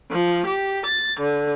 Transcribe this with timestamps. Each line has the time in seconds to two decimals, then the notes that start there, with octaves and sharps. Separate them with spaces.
0.12 F3
0.47 G4
0.87 A6
1.21 D3